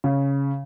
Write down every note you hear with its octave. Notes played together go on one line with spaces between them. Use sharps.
C#3